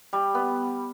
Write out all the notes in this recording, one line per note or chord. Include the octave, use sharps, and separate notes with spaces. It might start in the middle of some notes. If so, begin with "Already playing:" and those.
G3
B3